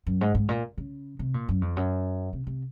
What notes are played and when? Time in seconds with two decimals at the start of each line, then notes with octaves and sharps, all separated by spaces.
0.07 F#2
0.21 G#2
0.35 G#2
0.49 A#2
0.78 C#3
1.19 C3
1.34 A#2
1.49 F#2
1.62 F2
1.76 F#2
2.33 C3
2.47 C3